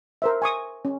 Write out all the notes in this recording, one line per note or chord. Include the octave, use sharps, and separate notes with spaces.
A#4 C5 E5
G#5 C#6 D#6
C#4